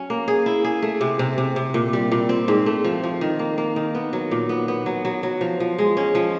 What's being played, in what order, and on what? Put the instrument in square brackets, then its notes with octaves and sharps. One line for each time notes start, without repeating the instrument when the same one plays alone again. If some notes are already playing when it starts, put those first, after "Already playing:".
Already playing: [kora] F#3 C#4
A#3
G#4
E4
G#4
A3
C3
C3
C3
C3
A#2
G3
A#2
C4
G#2
A3
F3
F3
D#3
A#3
A#3
D#3
B3
F#3
A#2
B3
B3
F#3
F#3
F#3
F3
F3
G#3
C#4
F3